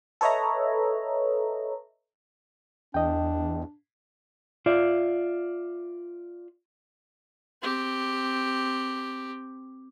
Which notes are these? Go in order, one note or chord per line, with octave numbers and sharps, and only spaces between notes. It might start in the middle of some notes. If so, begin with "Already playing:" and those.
A4 B4 C#5 D#5 E5 A#5
E2 D4 D#5 G5
F4 D5 E5
C4 G4